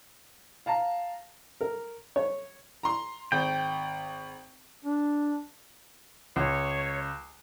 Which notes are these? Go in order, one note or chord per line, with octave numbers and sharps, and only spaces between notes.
F5 A5 A#5
A#4
C#5
A#5 C6
G#1 G5
D4
C#2 C#5